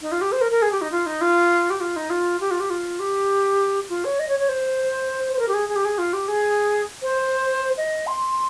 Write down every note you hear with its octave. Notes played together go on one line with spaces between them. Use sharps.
D#4
F4
G4
C5
A#4
A#4
G#4
G4
D#4
F4
D#4
F4
G4
F4
D#4
F4
G4
F4
G4
F4
G4
F4
C#5
D#5
C#5
C#5
C5
C5
A#4
G4
G#4
G#4
G4
G#4
F4
G4
G#4
C5
D#5
C6